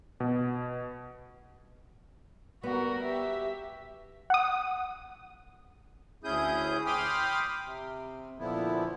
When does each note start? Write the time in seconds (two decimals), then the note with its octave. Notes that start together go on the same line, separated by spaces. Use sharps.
0.20 B2
2.63 G3 B3 F#4 A#4
3.02 G4 E5
4.30 F#5 D#6
6.24 D2 C#4 E4 G#4 D#6 G6
6.86 G5 B5 C6 D6 D#6 F6
7.64 C3
8.39 A#2 D3 F3 B3 E4